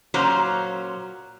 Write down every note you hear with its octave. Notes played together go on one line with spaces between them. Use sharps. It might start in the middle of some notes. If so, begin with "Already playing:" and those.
A#2 F#3 C#4 C5 A#5